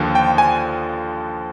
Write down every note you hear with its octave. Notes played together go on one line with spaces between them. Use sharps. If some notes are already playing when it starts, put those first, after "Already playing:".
Already playing: D#2 D3 F3
G5
G#5